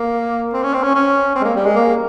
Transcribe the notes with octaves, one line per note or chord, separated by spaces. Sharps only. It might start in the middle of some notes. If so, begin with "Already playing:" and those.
Already playing: A#3
C4
C#4
C4
C#4
C#4
C4
G#3
A#3
G3
G#3
A#3